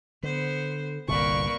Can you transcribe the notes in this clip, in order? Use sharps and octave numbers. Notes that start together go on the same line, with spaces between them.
D3 B3 C5
G1 C2 A#2 A#3 B4 D5 C#6